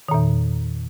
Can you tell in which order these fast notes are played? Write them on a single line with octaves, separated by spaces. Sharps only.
D#3 A#2 E2